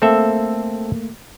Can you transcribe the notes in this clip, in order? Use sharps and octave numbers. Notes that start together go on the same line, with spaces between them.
A3 A#3 C4 A4 E5